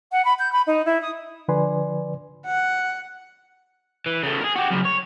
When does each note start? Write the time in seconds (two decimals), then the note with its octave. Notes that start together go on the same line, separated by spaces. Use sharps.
0.12 F#5
0.24 B5
0.39 G6
0.52 B5
0.66 D#4
0.85 E4
1.01 D#6
1.48 D3 F3 B4 D5 G#5 C6
2.45 F#5
4.06 E3
4.23 C#3 A3
4.41 G#4 A#4
4.56 F#4 G4
4.71 F#2 C#3
4.86 C#5